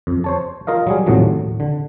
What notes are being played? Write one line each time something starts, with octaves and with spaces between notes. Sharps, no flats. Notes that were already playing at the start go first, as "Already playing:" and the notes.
F2
C5 C#5 A5
F4 A#4 D#5 F5
F#3 G3 G#4
D#2 A2 C3 F3 F#3
D3